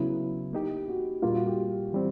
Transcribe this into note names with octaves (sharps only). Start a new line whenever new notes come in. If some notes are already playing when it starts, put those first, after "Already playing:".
Already playing: C#3 F#3 B3 E4
A#3 D#4 G4
F#4
A#2 G3 A#3 F4
F#4
G4
E3 G3 C4